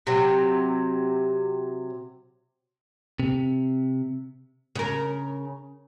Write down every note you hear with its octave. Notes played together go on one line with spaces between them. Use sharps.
C3 F#3
C3
C#3 A#4